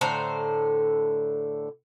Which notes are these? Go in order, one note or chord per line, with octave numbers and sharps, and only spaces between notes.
A2 D3 C5 A#5